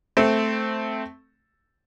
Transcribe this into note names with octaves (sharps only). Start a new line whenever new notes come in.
A3 C4